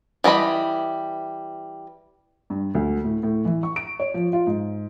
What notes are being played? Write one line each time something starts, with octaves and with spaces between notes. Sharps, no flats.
E3 G3 D#5 B5
G2
D2
A2
A2
E3
C#6
D7
C#5
F3
F4
G#2